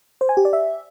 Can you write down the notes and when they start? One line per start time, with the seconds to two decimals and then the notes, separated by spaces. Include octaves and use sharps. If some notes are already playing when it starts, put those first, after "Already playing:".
0.21 C5
0.29 G#5
0.37 G4
0.45 D5
0.53 E5